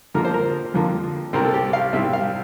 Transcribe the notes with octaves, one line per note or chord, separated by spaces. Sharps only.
F2 D3 F3 A#3 A#4
C5
A#4
F2 D3 F3 A#3
C2 C3 G3 C4 A#4
A4
G4
F5
C2 C3 G3 C4 E5
F5